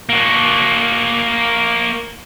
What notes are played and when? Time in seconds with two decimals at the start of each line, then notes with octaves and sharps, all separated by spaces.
0.09 A#3 F#4